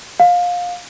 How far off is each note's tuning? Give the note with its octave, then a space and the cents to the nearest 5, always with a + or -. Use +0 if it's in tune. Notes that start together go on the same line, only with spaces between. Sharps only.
F5 +25